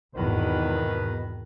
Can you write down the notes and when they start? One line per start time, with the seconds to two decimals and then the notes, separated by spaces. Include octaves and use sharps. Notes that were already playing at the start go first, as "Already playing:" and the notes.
0.16 G#1 E2 B2 D#3 B4